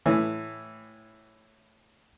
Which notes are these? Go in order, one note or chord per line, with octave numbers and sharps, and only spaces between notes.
A2 E3